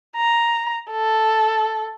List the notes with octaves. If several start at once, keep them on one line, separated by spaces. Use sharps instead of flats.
A#5
A4